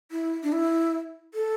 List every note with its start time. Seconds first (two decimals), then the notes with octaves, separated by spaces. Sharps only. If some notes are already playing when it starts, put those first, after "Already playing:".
0.11 E4
0.43 D4
0.52 E4
1.34 A4